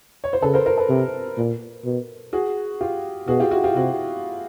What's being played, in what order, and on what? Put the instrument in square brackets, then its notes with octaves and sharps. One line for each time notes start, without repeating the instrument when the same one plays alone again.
[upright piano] C#5
C5
[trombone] C#3 [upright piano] A4 B4
[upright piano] A#4 C5
A#4 C5
A4 B4
[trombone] C3
A#2
B2
[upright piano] F#4 G#4
F4 G4
[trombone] B2 [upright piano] F#4 G#4
[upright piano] F4 G4
E4 F#4
F4 G4
[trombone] C3 [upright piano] E4 F#4